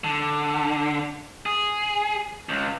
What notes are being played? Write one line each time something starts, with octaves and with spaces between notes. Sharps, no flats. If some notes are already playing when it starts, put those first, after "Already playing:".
D3
G#4
C#2